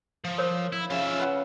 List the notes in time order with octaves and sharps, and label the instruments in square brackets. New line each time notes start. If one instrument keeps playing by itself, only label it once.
[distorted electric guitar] F3
[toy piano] A#4 C5 C#5
[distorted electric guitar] E4
[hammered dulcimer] C#3 [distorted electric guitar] F4 E5
[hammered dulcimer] B4 F#5